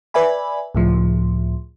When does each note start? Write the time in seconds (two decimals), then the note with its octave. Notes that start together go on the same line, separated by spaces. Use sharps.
0.14 B4 D5 E5 G#5 B5
0.75 C#2 A2 F3